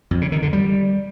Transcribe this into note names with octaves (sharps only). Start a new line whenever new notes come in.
F2
C#3
D#3
D3
G3